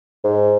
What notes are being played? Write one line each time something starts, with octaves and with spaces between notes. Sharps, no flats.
G#2